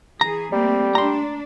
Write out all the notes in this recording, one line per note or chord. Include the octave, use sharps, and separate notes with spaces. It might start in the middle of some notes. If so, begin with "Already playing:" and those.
E3 G#4 A#5
G3 A3 A#3 C4
D4 A#5 C6